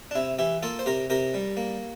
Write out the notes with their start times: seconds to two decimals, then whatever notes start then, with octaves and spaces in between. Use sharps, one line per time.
0.11 D4
0.15 C3 E4
0.39 E3 E4 G4
0.63 A#3 F4 A4
0.79 C5
0.86 C3 G4 A#4
1.10 C3 G4 A#4
1.34 G3
1.57 A#3